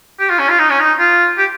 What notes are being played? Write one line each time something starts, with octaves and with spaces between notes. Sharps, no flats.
G4
F4
C#4
F4
D#4
C#4
D#4
F4
G4